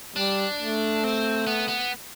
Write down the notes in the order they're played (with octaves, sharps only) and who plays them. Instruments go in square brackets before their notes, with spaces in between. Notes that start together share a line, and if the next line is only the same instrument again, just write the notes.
[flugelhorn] G3 [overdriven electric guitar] D4
[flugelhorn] A3
[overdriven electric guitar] C4
B3
B3